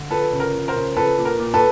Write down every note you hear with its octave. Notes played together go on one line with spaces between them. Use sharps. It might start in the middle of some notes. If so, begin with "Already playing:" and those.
Already playing: D3
F3 A4 B4
C#3
A#4
F3
A#4 C5
C#3
F3 A4 B4
A#2
A#4
A#2
A4 B4